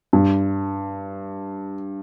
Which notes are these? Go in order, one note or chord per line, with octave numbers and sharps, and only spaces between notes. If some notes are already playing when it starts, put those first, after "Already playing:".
G2